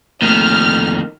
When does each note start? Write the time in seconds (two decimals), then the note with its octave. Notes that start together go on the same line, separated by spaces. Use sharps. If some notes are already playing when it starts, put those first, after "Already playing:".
0.22 F2 D#3 A3 A#3 F6